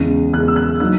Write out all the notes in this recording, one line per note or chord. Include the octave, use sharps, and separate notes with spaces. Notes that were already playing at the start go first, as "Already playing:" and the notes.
Already playing: E2 C#3 G#3
E2 C#3 G#3 F#6
E6
F#6
F#3 A#3 D#4 F#6